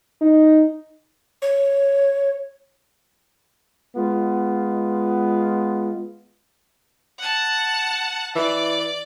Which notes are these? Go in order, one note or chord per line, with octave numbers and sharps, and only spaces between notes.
D#4
C#5
G#3 B3 F4
F#5 A5
E3 D5